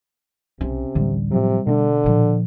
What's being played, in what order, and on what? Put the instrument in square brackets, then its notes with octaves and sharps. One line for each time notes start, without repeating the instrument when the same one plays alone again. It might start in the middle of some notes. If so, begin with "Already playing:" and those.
[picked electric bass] B1 [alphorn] C3 [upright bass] C#4
[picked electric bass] D1 A1 D3 [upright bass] G3
[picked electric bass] A2 F3 F#3 [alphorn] C3
[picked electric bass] B2 A3 D4 [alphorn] D3
[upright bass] A#2 F3